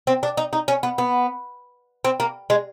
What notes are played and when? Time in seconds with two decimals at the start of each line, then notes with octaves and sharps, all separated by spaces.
0.07 C4
0.23 D4
0.37 D#4
0.53 D#4
0.68 C#4
0.83 B3
0.98 B3
2.05 C4
2.20 A#3
2.50 G#3